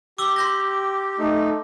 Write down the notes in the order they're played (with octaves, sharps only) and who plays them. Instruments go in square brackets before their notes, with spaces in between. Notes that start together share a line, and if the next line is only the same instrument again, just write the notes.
[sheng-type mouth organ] G4 [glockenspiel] D6 E6 G7
[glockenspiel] C6 G6 A#6
[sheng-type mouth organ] A3 D#4